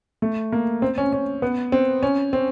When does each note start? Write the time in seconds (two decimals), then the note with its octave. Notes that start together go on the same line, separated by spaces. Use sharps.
0.22 A3
0.52 A#3
0.82 C4
0.98 C#4
1.13 C#4
1.42 B3
1.72 C4
2.03 C#4
2.33 C4